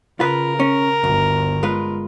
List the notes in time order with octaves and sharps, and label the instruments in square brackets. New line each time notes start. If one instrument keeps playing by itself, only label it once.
[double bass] C#3 [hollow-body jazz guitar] F4 B4 [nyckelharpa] A#4
[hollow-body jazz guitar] C#4
[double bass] G1 [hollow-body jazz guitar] D2
[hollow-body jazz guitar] G#3 F4 B4